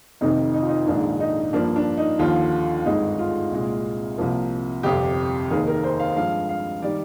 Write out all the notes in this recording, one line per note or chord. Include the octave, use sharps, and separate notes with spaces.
F1 F2 C3 D#3 D#4
D#4
F4
D#4
A#1 G#2 D#3 A#3 D4
D#4
G2 F3 A#3 D4
D4
D#4
D#2 D3 F3 F4
G#1 G2 D3 G#3 D#4
F4
C2 A#2 G#3
C2 C3 F3 A#3
G1 F2 C3 G4
F1 D#2 D#3 A#3 G#4
A#4
C5
F5
G2 F3 G#3 F5
F5
D#3 G3 D5